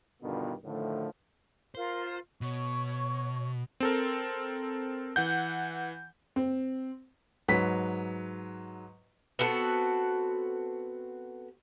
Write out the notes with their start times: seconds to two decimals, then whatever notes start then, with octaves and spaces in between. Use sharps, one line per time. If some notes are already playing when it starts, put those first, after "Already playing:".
0.22 G2 B2 D3 D#3 B3 F4
0.64 A2 D3 D#3 F3 A3
1.75 F4 A#4 C5
2.41 B2 C#5 C#6
3.80 C4 A4 A#4
5.16 E3 F#5 G6
6.36 C4
7.48 G#2 F#3 B4 B6
9.39 B3 C4 F#4 A4